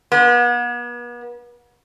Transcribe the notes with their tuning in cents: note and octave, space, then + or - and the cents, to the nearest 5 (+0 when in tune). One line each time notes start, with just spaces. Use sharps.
B3 -40